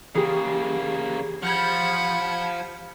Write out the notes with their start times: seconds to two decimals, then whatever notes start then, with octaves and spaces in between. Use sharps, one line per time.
0.15 C#3 E3 A#3 G4 G#4
1.43 F3 F#5 B5 F6 G6 G#6